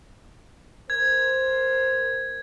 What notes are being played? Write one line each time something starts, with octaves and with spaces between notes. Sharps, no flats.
A#4 C5 G#6